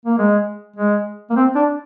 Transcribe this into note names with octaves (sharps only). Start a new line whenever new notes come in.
A#3
G#3
G#3
A#3
C4
D4